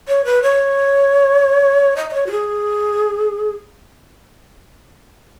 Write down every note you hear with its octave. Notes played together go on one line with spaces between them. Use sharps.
C#5
B4
C#5
D#5
D#5
C#5
F#4
G#4